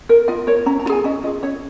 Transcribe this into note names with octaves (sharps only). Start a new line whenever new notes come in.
A#4
F4 D#5
A#4 C#5
C#4 A#5
A#5
F4
G#4 G#5
C#4 D#5
F4 G#4 D#5
C#4 C#5